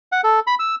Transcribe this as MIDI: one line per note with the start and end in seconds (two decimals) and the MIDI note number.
0.12 0.21 78
0.24 0.40 69
0.47 0.55 83
0.59 0.75 88